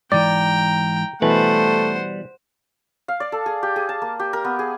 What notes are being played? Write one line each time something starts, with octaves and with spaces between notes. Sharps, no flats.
G#2 E3 D5 G5 A#5
B2 E3 G3 A3 B4 C5 F#5
F5
D5
A4
G#4
G4
G#4
A5
A#3
G4
A#4
B3
G#4